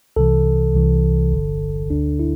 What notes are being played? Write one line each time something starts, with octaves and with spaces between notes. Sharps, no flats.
C2 C3 E3 A4
C2 C3 E3
G1 G2 D3
D2 D3 D4
E4